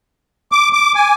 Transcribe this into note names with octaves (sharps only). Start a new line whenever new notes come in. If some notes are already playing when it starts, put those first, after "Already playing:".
D6
D6
G#5